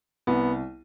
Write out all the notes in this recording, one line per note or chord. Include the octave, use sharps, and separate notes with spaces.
C2 B3